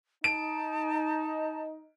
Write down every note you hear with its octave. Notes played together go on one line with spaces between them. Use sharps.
D#4 A5 D7